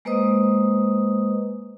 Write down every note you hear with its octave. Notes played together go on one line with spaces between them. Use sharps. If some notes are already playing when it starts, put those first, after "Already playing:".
G#3 A#3 B4 C5 D#5 D#6